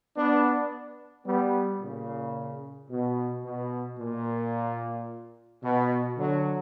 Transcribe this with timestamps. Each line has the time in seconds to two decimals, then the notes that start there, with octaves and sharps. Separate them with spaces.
0.17 B3 D4
1.26 G3 B3
1.81 A#2 C#3
2.91 B2
3.45 B2
3.99 A#2
5.64 B2
6.18 D3 F#3